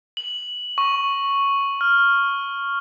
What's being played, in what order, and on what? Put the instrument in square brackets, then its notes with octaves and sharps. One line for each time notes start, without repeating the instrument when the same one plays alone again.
[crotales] F#7
C#6
F6